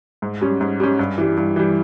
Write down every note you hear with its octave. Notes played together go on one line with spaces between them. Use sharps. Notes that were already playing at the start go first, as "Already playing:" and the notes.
G#2
G3 C#4
G#2
G3 C#4
G2
E3 G3
G2
E3 G3